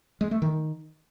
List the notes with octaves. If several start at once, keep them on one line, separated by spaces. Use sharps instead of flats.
G#3
A3
D#3